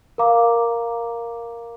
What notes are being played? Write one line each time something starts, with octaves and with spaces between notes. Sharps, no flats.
A#4 F5 A#5 D6